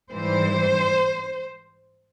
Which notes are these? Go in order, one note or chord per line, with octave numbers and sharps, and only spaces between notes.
G#2 E3 G3 C5